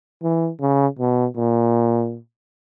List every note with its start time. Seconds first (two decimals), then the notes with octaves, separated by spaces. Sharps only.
0.23 E3
0.60 C#3
0.99 B2
1.37 A#2